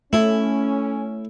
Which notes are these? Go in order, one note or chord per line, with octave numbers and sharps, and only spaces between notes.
A3 C#4 E4